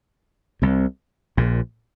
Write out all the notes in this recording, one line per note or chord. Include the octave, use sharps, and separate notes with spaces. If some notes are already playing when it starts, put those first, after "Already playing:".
C2 C3
A#1 A#2